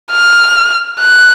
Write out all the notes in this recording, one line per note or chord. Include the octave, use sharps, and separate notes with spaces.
F6
F#6